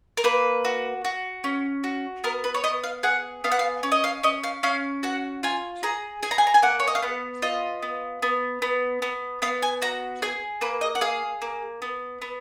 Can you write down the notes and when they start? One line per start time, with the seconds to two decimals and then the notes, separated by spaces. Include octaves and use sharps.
0.17 A#4
0.24 A#3 B4
0.65 F#4
1.05 F#4
1.44 C#4
1.84 F#4
2.24 B3 A#4
2.44 B4
2.54 C#5
2.64 B3 D#5
2.84 F5
3.03 G#4 F#5
3.44 B3 F5
3.52 F#5
3.59 F5
3.83 C#4
3.92 D#5
4.04 F5
4.23 C#4 D#5
4.44 F5
4.63 C#4 F5
5.03 F#4 F#5
5.43 F4 G#5
5.83 G#4 A#5
6.23 G#4 G#5
6.31 A#5
6.38 G#5
6.47 A#5
6.54 G#5
6.62 A#3 F#5
6.80 C#5
6.88 D#5
6.95 F5
7.02 B3 F#5
7.42 F4 D#5
7.82 B3
8.22 B3
8.62 B3
9.02 B3
9.42 B3 F5
9.62 G#5
9.82 F#4 A#5
10.22 G#4 G#5
10.61 A#3 B4
10.81 D#5
10.95 F#5
11.01 G#4 F5
11.42 A#3
11.82 B3
12.22 B3